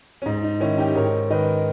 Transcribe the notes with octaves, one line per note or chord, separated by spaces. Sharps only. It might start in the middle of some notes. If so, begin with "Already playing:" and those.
C#4
G#2 D#4
D#4
D#3 C#4 E4
D#4 G4
G#2 A#4 C#5
D#3 B4 D#5